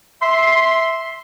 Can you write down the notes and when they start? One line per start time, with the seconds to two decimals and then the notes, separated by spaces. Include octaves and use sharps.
0.22 E5 C6